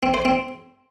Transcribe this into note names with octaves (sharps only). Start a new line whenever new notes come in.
C4
C5
C4